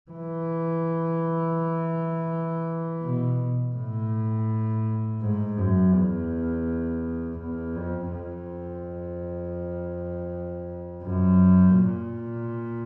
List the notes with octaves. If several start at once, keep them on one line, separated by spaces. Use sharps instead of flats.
E3
B2
A2
G#2
F#2
E2
E2
F2
F2
F#2
A#2